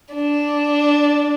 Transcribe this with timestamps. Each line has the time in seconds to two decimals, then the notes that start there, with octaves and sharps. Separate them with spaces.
0.15 D4